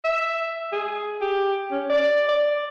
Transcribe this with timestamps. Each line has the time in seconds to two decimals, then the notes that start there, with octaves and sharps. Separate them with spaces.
0.05 E5
0.72 G#4
1.21 G4
1.71 C#4
1.89 D5
2.29 D5